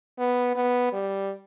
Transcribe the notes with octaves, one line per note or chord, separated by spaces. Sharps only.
B3
B3
G3